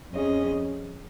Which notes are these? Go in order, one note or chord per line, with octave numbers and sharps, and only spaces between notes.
F2 F3 C#4 G#4 D#5